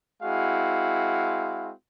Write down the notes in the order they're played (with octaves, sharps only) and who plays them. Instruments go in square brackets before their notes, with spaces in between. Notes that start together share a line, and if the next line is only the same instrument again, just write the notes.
[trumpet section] G#3 C4 E4 F#4 F5